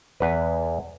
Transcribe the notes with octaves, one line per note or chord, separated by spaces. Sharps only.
E2 B4